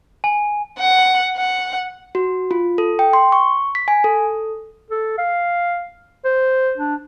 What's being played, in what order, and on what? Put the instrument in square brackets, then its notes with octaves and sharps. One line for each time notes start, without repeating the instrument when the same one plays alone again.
[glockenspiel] G#5
[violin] F#5
F#5
[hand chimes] F#4
F4
A4
G5
C6
C#6
B6
G#5
A4
[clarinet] A4
F5
C5
D4